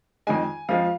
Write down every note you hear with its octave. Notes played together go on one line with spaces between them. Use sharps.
F2 D#3 G#3 G#5
F2 F3 G#3 F5